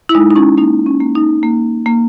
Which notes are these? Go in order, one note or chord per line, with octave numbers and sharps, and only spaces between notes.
E4
G#3 D#4
D#4
C#4 E4
A#3 D#4
C#4
A#3
D#4
A#3
A#3